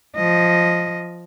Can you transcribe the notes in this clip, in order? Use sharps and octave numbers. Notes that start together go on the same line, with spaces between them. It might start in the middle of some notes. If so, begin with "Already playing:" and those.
F3 D#5